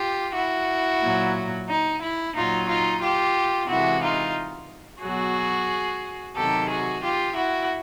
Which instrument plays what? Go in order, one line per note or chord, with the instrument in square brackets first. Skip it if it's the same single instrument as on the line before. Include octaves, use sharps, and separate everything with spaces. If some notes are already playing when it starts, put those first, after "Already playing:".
Already playing: [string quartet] F4 G4
E4 F#4
A#2 F#3
D#4
E4
A#2 F#3 D#4 F4
D#4 F4
F4 G4
C3 E3 G#3 E4 F#4
D#4 F4
B2 F#3 F#4 G#4
C3 D#3 F#3 G4 A4
F#4 G#4
F4 G4
E4 F#4